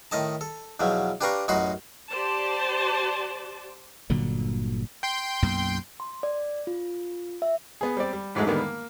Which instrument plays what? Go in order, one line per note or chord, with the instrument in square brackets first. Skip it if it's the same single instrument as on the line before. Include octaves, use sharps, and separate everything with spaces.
[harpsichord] A2 D#3 D#5 A5
A4
E2 B2 F3 F#3
D4 G4 B4 F5 A#5 C#6
A1 F#2 D#4 F#4 B5 C6
[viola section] G4 C5 D5 A5
[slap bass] G1 A#2 D3 F#3
[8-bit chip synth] G5 C6 G6
[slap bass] B1 F#2 A#3
[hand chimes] C6
D5
F4
E5
[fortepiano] B3 G#4
G3 C4 D5
G3
A1 G#2 F#3 G#3 A3
D3 D#3 G3 G#3 A#3 B3
A#3